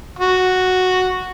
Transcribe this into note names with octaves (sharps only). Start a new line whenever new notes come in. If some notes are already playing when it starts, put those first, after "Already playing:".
F#4